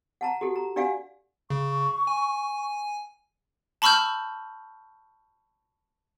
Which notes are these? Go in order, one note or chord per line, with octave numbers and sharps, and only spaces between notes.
F#5 A5 A#5
F#4 G4 A4
A#5
D4 G4 D5 F5 F#5 G#5
C#3 C#6
G#5
A5 B5 C#6 E6 F6 G6